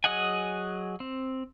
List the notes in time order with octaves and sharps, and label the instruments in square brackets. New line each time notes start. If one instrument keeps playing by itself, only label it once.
[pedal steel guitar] F#3 G#4 D#5 F#5 G#5
C4